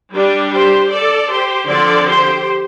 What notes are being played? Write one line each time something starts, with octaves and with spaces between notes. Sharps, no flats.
G3 D4
G4 C5
A4 D5
G4 C5
D3 F3 C4 A4 D5
G4 C5